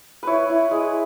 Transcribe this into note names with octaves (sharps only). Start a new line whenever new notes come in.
E4 B4 C#5
E4
G#3